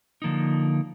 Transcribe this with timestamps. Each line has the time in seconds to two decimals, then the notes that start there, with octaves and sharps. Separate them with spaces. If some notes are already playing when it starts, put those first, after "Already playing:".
0.22 D3 F3 A#3 D#4